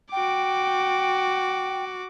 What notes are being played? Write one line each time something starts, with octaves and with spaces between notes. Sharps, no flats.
F#4 G5 D6